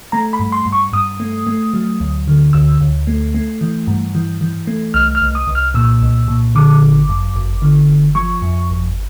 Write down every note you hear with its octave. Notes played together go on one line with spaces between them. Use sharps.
A3 A#5
B5
G2
C6
G2
C#6
G2 D#6
A3
A3
F#3
D2
D3
D2 E6
D2
A3
A3
E3
G2
E3
E3
A3
C2 F6
F6
C2
D#6
C2
F6
A#2 E6
C2
A#2
D3 D6
G1
F#2
G1
D3
G1
F3 C#6
F2
G1